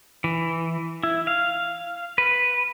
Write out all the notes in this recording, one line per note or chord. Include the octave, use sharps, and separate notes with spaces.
E3
E4
F5
B4